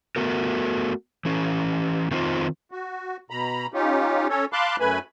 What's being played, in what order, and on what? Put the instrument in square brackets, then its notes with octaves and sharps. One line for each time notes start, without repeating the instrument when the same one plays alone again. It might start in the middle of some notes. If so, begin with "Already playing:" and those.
[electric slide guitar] A3 B3 F#4 A#4
E3 C#4
D#3 C4 D#4 F4 C5
[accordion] F#4
B2 A#5 B5
C#4 D#4 F4 G4
C#4 A4 C#5
F5 A5 B5 C6 D6 F#6
F#2 A3 B4 G#5 B5